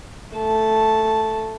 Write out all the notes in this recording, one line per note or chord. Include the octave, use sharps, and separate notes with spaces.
A3 A5